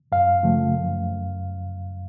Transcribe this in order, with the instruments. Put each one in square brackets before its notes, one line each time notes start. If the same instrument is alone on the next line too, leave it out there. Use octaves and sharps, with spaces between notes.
[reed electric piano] F#2 F5
C#3 F3 A3
F#2